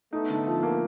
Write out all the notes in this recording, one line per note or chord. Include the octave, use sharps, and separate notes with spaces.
A3 B3 D#4
D3
F3
A#3